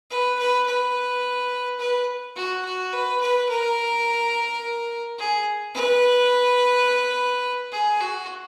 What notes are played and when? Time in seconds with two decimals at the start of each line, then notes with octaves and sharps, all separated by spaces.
0.11 B4
0.39 B4
0.67 B4
1.79 B4
2.36 F#4
2.65 F#4
2.92 B4
3.21 B4
3.49 A#4
5.19 G#4
5.75 B4
7.72 G#4
8.01 F#4